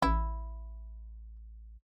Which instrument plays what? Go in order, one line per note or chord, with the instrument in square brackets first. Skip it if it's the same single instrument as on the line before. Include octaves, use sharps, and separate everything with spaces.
[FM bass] A1 [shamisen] E4